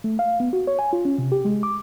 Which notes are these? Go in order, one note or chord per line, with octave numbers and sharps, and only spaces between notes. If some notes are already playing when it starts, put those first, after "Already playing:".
A3
F5
B3
F#4
C#5
G#5
F4
C#4
C3
G4
G#3
D6